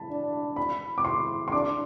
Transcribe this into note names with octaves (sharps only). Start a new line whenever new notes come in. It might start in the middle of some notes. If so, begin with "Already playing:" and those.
Already playing: A5 B5
D4
B5
D6
C6
C6
D4 D6